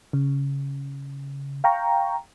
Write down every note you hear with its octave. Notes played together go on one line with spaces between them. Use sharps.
C#3
F5 G5 A#5 C#6